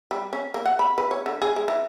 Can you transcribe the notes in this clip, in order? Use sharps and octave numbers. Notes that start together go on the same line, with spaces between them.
G3
C#4
A#3
F#5
B5
B4
C#5
D3
G#4
G#3
E3